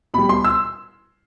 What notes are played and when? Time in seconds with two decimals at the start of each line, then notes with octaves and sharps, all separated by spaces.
0.14 B2 G3 B5
0.29 C6
0.44 E6